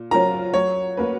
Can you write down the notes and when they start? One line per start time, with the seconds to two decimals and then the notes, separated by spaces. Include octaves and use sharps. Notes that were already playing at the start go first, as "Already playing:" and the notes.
Already playing: A#2
0.11 F#3 C#4 F4 A#4 A#5
0.54 F#3 C#5
0.97 A#3 C#4 F#4 B4